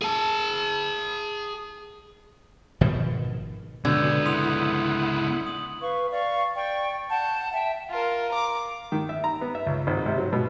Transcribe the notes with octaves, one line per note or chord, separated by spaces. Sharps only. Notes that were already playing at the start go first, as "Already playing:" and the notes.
G#4 A5
G#1 B2 D#3 F3
C#2 B2 D3 B3 G6 G#6
E4 F#5 C6 D#6 F7
D#6 F#7
B4 F5 C#6
D5 F5 C#6
D5 G5 C#6
F#5 A5 G6
E5 G5 A5
F4 A#4
A#5 D6
D#3
E5
A#5
B3
E5
C#2
G#1
C3
F#3
B2